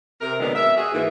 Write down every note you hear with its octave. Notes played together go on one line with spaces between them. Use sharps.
C3 A#4
B2 D3 D#3 F#3 G#3 B3
E5
F#4 G#4
G#2 E3 A#3